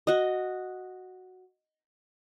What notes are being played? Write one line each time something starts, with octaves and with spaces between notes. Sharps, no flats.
F#4 D#5